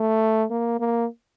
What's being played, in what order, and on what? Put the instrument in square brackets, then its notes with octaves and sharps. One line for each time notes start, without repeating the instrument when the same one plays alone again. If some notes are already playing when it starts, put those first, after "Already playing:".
Already playing: [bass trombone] A3
A#3
A#3